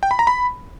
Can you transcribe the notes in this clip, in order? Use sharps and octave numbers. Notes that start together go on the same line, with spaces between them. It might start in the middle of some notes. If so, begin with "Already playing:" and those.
G5
B5
A#5
B5